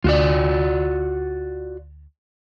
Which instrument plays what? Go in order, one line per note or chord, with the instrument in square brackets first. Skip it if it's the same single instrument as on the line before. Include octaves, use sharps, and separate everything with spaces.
[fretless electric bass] D2 [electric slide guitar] F4 F#4 D5